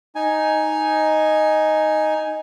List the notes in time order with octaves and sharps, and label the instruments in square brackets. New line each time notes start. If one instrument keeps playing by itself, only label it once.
[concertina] D#4 G#5